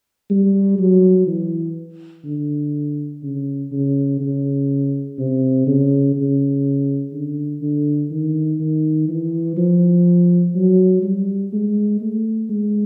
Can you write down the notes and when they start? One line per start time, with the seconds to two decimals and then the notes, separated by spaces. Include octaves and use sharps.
0.30 G3
0.79 F#3
1.27 E3
2.25 D3
3.23 C#3
3.72 C#3
4.20 C#3
5.18 C3
5.67 C#3
6.15 C#3
7.12 D3
7.61 D3
8.10 D#3
8.59 D#3
9.08 E3
9.57 F3
10.55 F#3
11.03 G3
11.52 G#3
12.00 A3
12.49 G#3